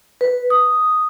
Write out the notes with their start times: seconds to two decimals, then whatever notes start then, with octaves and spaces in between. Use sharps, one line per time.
0.21 B4
0.50 D#6